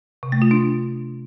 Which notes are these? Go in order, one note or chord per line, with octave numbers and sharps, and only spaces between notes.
C3
A3
F4
D4